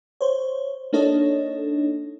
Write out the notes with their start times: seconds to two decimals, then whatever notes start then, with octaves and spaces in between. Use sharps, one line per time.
0.21 C5 C#5
0.93 A#3 D4 D#4 A4 C#5 D#5